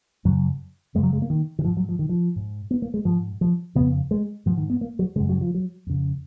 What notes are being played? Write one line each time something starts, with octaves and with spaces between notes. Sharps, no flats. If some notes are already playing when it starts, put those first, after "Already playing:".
F#2 C#3 F#3
F#2 C#3 G#3
F#3
G#3
A#3
D#3
D#3
G#2 F3
F#3
F3
D#3
F3
G#2
B3
A#3
G#3
G#2 F3
F3
F2 C#3 B3
G#3
G#2 F3
D#3
B3
A#3
F#3
F#2 C#3 G#3
F#3
F3
F#3
F2 C#3